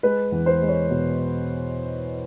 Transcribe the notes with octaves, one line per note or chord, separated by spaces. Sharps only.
G#3 B4
E2
C5
G#3
C#5
B2